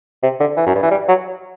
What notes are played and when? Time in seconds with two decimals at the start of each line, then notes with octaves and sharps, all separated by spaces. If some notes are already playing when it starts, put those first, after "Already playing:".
0.23 C3
0.40 D3
0.57 E3
0.66 F#2
0.75 G2
0.83 E3
0.91 G3
1.08 F#3